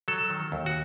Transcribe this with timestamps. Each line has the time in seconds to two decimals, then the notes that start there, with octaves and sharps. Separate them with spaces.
0.08 F#3 A4
0.30 D#3
0.52 D#2
0.66 F#4